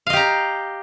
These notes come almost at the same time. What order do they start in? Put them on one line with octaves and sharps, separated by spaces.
F5 D#5 G4 A#5